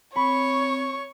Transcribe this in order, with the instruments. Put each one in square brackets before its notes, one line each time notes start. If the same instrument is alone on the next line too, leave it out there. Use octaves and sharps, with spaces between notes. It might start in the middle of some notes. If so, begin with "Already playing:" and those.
[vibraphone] C4 [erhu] C#5 [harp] B5 [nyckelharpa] C#6